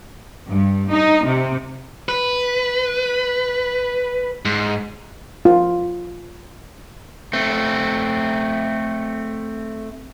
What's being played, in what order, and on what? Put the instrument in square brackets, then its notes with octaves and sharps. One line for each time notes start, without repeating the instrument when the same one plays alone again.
[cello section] G2
D#4
C3
[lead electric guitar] B4
G#2
[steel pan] F4
[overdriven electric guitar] A3 C4